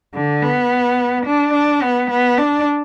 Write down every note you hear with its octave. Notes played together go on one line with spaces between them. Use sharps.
D3
B3
D4
D4
B3
B3
D4